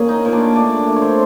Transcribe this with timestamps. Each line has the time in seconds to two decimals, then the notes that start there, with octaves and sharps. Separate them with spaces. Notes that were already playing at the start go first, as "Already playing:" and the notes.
Already playing: A#3 C#4 G#4 G#5
0.09 D#4 D#5
0.25 A#2 C#5
0.32 D4 D5
0.55 A3 D4 D5
0.87 A3
0.96 C#5
1.02 C4 C5